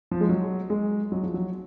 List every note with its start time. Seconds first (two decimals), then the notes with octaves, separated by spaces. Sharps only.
0.11 F3
0.21 G#3
0.29 F#3
0.70 G#3
1.12 F#3
1.23 F3
1.34 F#3